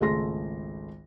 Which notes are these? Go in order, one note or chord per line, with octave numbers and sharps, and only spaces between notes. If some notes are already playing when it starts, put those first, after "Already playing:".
G#1 C#2 A3 G#4 C6 A#6